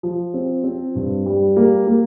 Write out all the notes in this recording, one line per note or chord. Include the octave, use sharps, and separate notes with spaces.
F3
C4
C4
G2
G3
A#3
A#3